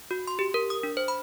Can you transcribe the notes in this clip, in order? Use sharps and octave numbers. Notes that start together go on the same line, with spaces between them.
F#4
C6
G4
A#4
D#6
D4
C5
B5